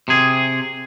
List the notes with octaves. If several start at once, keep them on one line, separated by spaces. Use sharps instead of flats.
C3 G#4